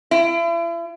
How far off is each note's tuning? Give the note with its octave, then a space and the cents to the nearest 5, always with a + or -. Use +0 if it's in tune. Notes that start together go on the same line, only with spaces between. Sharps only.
E4 +40